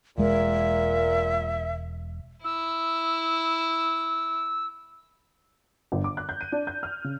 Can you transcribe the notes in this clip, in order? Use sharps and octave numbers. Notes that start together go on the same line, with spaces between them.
E1 A#2 G#3 A#4 E5
E4 E6
G1
D6
F#6
G6
D#7
D4
G6
F6
C#3